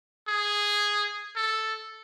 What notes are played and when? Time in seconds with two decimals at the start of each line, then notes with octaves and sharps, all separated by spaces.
0.28 G#4
1.36 A4